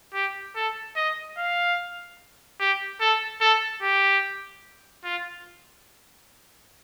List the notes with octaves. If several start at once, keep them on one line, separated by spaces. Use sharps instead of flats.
G4
A4
D#5
F5
G4
A4
A4
G4
F4